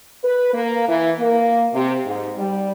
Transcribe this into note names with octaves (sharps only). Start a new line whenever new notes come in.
B4
A#3
E3
A#3
C3
G#2
G3